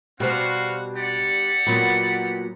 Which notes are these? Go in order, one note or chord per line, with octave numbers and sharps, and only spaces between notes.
B2 G3 C4 D4 F#4 C5 F5
G4 D5 F#5
A#2 F#3 B3